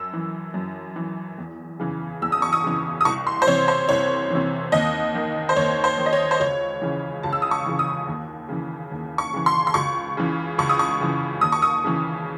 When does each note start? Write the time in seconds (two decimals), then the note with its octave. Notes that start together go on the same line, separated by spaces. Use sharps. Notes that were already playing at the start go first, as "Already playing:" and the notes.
Already playing: F#2 E6
0.13 E3
0.54 F#2
0.96 E3
1.38 E2
1.80 C#3 E3
2.22 E2 E6
2.32 D#6
2.42 C#6
2.53 D#6
2.64 C#3 E3
3.01 D#6
3.05 C2 C#6
3.27 C6
3.42 C5
3.47 C3 E3 C#5
3.68 C5
3.89 C2 C#5
4.30 C3 E3
4.72 D#2 D#5
5.15 D#3
5.49 C5
5.56 D#2 C#5
5.84 C5
5.98 D#3
6.06 D#5
6.13 C#5
6.31 C5
6.40 C#2 C#5
6.82 C#3 E3
7.23 C#2 A5
7.32 E6
7.42 D#6
7.51 C#6
7.66 C#3 E3
7.79 D#6
8.07 D#2
8.49 C#3 E3
8.92 D#2
9.18 C#6
9.33 C#3 E3
9.46 C6
9.67 C6
9.74 C#2 C#6
10.17 C#3 E3
10.58 C#2 C#6
10.69 D#6
10.79 C#6
11.01 C#3 E3
11.41 D#2 D#6
11.52 C#6
11.62 D#6
11.84 C#3 E3